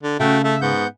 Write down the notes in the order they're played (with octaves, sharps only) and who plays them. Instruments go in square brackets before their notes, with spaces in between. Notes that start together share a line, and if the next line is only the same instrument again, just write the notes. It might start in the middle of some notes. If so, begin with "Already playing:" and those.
[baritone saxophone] D3
[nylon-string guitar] C#3 [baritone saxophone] A3 [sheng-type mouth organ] F#4 E5 G5
[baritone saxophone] A3 [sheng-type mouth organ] E5
[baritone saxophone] G#2 [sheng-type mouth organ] B3 F#5 G6